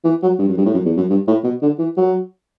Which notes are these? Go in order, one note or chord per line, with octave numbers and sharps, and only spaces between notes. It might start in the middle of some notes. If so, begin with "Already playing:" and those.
E3
F#3
G2
F#2
G2
A2
F#2
E2
F#2
G2
A2
B2
D3
E3
F#3